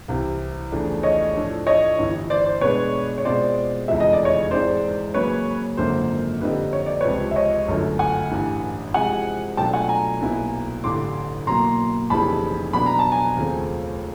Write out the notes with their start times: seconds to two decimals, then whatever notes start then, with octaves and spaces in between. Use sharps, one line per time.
0.08 C2 C3 E3
0.72 E2 C#3 F3 A3 D4
1.03 C#5 D#5
1.35 A2 F3 A3 D4
1.67 C#5 D#5
1.98 G1 G2 E3
2.30 C5 D5
2.46 C5
2.61 B2 G#3 B3 D4 B4 C#5
3.18 C#5
3.25 B2 G#3 C4 F4 C5 D5
3.88 F1 E2 C#3 F3 G#3 E5
4.00 D#5
4.13 D5
4.25 C#5 D#5
4.51 G#2 E3 G#3 C4 C5 D5
5.14 C#3 F#3 A#3 C#4 B4 C#5
5.77 G#1 F#2 D3 F3 A#3 C5
6.41 F2 D3 G3 C4 D#4 B4
6.73 C#5
6.86 D5
7.01 C#2 C3 F3 B4 C#5
7.31 E5
7.36 C#5 D#5
7.68 G1 F#2 D3 F#3 A3
7.99 F#5 G#5
8.31 A1 G2 E3
8.94 C3 F3 G#3 F#5 G#5
9.57 B2 F#3 A3 D4 F4 G5 A5
9.73 F#5 G#5
9.89 G#5 A#5
10.21 B1 A#2 F#3 B3 E4
10.84 A1 G2 D3 C6 D6
11.47 B2 F#3 A#3 A#5 C6
12.10 F1 F2 C#3 E3 G3 A5 B5
12.73 B2 F#3 B3 D4 B5
12.86 A#5
12.99 A5
13.12 G#5 A#5
13.37 D#2 C#3 F3 A3 C4